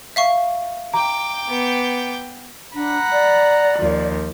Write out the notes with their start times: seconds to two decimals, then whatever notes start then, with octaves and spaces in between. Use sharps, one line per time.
0.16 E5 F5 C#6
0.94 G5 A#5 D6
1.49 B3
2.75 D4 F#5 A#5 B5
3.13 D5
3.78 D#2 F3